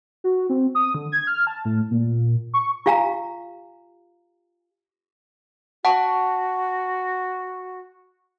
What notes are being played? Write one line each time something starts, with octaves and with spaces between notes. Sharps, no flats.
F#4
C4
D#6
D3
G#6
F6
A5
A2
A#2
C#6
F4 G4 F5 G#5 A#5
F#4 F#5 A5 C#6